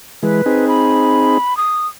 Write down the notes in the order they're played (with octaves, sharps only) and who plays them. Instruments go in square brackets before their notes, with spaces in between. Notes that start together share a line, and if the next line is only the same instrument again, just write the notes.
[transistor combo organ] E3 G#3 [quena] B4
[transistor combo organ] C4 D#4 G#4
[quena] B5
D#6